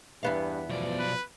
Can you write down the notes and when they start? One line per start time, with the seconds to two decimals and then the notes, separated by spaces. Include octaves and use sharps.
0.23 E2 G2 B3 F5
0.70 B1 F3 D5
0.99 B4